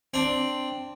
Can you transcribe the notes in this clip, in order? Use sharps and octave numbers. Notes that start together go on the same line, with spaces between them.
C4 D4